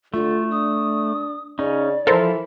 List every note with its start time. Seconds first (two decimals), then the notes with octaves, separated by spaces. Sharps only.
0.14 D3 A3 F4
0.52 D4 D#6
1.59 C#3 C#4 D#4 D5
2.07 E3 F3 E4 A4 A#4 C5 F5